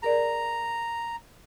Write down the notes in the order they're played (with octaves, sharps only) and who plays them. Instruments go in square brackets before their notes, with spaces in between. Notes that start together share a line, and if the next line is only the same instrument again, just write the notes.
[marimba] G#4 A#4 D5 [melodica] A#5